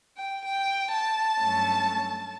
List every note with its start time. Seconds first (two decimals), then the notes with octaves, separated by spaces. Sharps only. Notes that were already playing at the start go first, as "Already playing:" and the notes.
0.16 G5
0.45 G5
0.92 A5
1.37 G2 F#3 A3 C#4